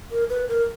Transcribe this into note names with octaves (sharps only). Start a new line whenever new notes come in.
A#4
B4
A#4